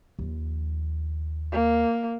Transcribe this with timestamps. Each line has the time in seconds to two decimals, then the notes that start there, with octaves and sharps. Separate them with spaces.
0.19 D#2 F3
1.52 A#3